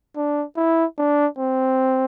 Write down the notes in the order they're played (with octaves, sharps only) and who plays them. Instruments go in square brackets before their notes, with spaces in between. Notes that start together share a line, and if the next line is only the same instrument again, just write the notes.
[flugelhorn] D4
E4
D4
C4